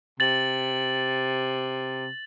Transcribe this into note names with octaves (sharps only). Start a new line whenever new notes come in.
C3 A6 F#7